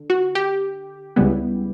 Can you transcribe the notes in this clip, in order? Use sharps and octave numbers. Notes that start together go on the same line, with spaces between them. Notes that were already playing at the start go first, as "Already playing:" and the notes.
Already playing: D3
F#4
G4
C#2 C#3 G3 B3 E4